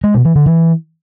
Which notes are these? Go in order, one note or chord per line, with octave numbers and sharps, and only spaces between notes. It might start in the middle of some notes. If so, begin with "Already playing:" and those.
G#3
B2
E3
D3
E3